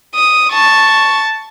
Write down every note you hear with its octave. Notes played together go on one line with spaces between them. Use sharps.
D#6
A5 C#6